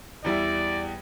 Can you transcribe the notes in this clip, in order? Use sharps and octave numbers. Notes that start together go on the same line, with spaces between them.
E2 G3 E4 D5